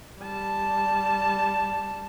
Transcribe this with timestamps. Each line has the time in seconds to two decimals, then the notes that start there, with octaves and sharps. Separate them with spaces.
0.21 G3 A5